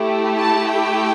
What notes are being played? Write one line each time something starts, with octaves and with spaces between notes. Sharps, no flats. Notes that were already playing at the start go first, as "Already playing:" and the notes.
Already playing: A3 E4 G4
A5
G5